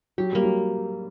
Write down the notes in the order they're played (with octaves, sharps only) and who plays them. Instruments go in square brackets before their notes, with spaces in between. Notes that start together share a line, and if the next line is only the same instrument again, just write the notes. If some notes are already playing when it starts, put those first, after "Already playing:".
[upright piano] F#3 [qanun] G4
[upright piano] G3 [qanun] A#3
[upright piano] F#3